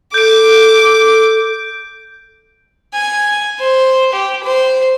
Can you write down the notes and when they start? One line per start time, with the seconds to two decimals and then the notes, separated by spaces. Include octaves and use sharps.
0.14 A4 D6 G6 D7
2.94 G#5
3.59 C5
4.13 G4
4.44 C5